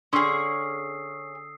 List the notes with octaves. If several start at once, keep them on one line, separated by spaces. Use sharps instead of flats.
D3 C#4 G#4 C6 D#6 E6 C7